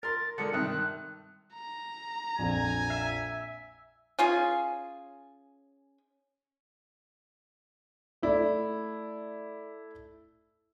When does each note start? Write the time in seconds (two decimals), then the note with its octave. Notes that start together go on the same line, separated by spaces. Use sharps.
0.03 A#4 C6 A6
0.38 D3 G#3 A#4 C#7
0.53 G2 C3 D#3 F#6
1.53 A#5
2.39 A#1 F2 G#5
2.90 E5
4.19 C#4 F4 G#4
8.22 A3 E4 D5